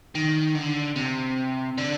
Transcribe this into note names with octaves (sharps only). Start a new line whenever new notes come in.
D#3
D3
C3
D3